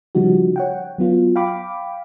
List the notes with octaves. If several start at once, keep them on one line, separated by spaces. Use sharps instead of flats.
C#3 F3 G3 D#4 F#4
C#5 F#5 G5
F#3 B3 F4
F5 G5 B5 D6